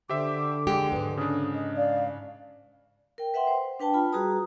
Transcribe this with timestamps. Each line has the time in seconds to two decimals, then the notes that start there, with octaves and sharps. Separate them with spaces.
0.09 D3 G4 C5 E5 D6
0.67 G#3 G4
0.92 D#2 G#2 B4
1.17 C#3 D4 D#6
1.54 D#5
1.77 D5 F5
3.18 A#4 G5
3.34 B4 E5 F#5 G5 C6
3.47 C5
3.80 D4 B4 G5 A5
3.94 F4 B5
4.13 G3 F#4 G#4 B4 A#5 D#6